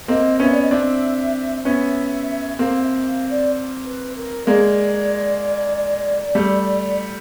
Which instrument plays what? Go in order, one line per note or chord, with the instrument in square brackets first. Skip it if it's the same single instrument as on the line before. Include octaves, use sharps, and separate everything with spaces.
[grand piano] A#3 C4 [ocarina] D#5
[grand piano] B3 C#4 [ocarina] E5
[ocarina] D5
D#5
[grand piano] C4 D4 [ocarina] E5
[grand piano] B3 C#4 [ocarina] E5
[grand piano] A#3 C4 [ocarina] F5
[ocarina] E5
F5
D5
B4
A#4
[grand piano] G#3 A#3 [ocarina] D5
[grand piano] G3 A3